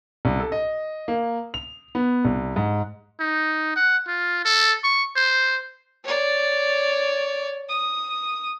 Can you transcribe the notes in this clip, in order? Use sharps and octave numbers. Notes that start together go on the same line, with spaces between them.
C2
A4
D#5
A#3
F7
B3
C2
G#2
D#4
F#5
F4
A4
C#6
C5
C#5 D5
D#6